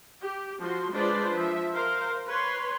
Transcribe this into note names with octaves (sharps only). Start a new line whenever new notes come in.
G4
F3 F#4 C6
G#3 D4 F4 B4 C5 D5
F3 E5
A#4 C5 F5
B4 C#5 C6